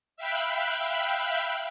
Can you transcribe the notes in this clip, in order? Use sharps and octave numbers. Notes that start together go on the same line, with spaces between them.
E5 F5 G5 B5 F#6